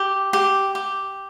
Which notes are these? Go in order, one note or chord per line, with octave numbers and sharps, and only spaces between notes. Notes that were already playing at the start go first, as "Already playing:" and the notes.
Already playing: G4
G4
G4